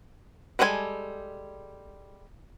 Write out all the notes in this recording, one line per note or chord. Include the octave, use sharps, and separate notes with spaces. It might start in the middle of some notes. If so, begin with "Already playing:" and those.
G3 G#3 A4 C5 G#5